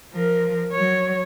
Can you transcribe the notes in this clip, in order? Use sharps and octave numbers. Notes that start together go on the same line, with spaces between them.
F3 A#4
F#3 C#5